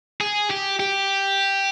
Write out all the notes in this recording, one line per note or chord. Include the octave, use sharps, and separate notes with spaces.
G#4
G4
G4